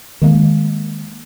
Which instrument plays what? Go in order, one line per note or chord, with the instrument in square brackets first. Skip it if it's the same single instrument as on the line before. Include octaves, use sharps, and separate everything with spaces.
[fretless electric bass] D#3 G#3 A#3